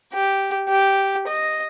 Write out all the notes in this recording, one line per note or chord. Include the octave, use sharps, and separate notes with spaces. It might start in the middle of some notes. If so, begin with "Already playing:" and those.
G4
G4
D#5